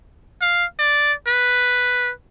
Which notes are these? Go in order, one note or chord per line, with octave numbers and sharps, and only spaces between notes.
F5
D5
B4